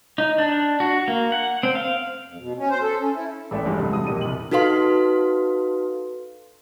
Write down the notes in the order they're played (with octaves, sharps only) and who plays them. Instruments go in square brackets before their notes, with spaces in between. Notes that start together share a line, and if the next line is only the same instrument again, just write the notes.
[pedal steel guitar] D#4
D4
F#4
A#3
F#5
C4
F5
[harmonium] F2
B2
C#4
C5
A4
C#4
E4
[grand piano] A1 A3 B3 D5 E5 G5
E2 G2 F3 G3 G#3
G2 C3 G#3 A3
G2 C3 E3 F#4 A5 D#6
E1 F2 A#2 G4 D#5 D#7
C2 F#7
[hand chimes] D#4 F#4 A4 B4 F5 C6